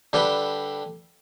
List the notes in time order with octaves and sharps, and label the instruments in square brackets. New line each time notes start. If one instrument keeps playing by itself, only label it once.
[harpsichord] D3 G3 G4 A4 B4